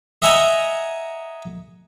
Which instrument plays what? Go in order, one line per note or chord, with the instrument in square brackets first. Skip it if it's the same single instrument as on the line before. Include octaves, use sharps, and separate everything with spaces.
[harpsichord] D#5 E5 F#5 G#5 A#5 D#6